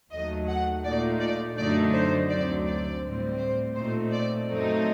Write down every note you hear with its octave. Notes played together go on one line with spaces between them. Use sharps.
D#2 D#3 F#3 A3 D#5
F#5
A#2 A3 D#4 D5
D5
F#2 D3 F#3 A3 D#4 D5
C5
D2 D3 F#3 C4 D5
D5
A2 G3 C4
C5
A#2 A3 C4 D#4 C5
D5
F#2 F#3 A3 C4 D#4